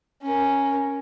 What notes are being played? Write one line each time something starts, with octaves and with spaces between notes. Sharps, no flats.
C#4 A#4